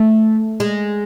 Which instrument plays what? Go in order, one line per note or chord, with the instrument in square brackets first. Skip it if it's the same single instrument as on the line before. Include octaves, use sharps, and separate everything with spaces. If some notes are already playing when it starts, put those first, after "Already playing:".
Already playing: [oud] A3
G#3